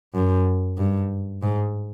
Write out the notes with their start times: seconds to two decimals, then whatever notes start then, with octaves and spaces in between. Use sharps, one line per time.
0.15 F#2
0.78 G2
1.43 G#2